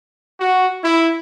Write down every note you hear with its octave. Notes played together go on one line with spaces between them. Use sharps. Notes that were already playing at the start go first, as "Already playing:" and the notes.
F#4
E4